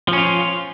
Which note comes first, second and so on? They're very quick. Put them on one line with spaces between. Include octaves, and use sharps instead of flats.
F3 C#4 F4